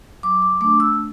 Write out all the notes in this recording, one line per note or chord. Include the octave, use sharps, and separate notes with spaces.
F#3 D6
D6
A3 D4 D6
E6